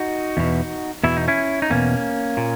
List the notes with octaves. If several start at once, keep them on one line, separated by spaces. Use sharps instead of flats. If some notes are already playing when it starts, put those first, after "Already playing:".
Already playing: D#4 F#4
E2 B2
E2 B2 E4
D#4
C#4 E4
D#4
E2 B2 A#3 C#4
A#2